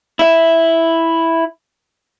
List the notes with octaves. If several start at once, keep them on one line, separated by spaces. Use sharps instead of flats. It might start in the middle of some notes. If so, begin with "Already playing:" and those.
E4 E5